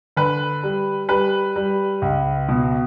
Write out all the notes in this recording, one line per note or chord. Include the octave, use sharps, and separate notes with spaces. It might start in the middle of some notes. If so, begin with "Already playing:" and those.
D3 B4
G3
G3 B4
G3
C#2
B2